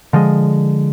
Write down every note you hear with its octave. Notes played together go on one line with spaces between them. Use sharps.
D3 F3 G#3